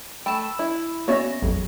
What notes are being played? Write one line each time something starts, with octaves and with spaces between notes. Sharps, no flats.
A3 G5 A5 B5 E6 E7
E4
A#3 B3 C#4 F#4 C#5 D5 E5 A#6
A1 F2 F#3 G#4